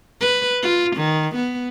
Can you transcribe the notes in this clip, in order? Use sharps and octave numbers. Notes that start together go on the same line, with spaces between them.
B4
F4
D#3
B3